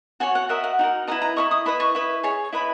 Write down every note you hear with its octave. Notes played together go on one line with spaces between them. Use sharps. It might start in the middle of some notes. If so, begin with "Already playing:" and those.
F#4 C#5 G#5
F#5
F#4 A#4 D#5 E5
F#5
D#4 F#4 A#4
E4 B4 D#5 A#5
A#5
E4 A#4 D#5 C#6
D#6
E4 B4 D#5 B5
C#6
E4 B4 D#5
G#4 C#5
E4 B4 D#5 B5